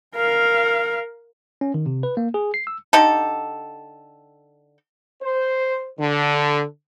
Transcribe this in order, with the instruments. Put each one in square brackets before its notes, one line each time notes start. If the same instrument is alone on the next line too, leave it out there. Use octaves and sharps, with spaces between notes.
[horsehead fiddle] A#4 F5
[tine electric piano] C#4
D#3
C3
B4
A#3
G#4
C7
E6
[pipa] D3 D#4 G4 A4
[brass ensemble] C5
D3